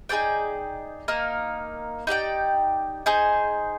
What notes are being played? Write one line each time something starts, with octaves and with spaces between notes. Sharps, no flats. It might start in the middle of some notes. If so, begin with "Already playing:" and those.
D#4 G#4 D5 G5
A#3 D#4 A#4
D#4 G4 D5 G5
D#4 G#4 C5